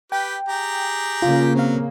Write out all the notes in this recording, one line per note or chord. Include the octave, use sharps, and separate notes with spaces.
G4 B4 G5
G4 G#4 A#5
C#3 A#3 F4
F#3 C4 F5